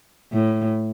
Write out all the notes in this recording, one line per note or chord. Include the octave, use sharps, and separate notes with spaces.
A2